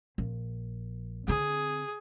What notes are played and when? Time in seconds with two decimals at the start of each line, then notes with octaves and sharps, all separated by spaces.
0.18 A#1
1.28 D3 C4 G#4